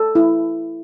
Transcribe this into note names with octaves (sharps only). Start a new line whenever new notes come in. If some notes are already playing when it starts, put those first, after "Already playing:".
Already playing: A4
E4